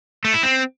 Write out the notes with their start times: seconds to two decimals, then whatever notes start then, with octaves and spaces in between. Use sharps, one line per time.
0.25 A3
0.34 E4
0.43 C4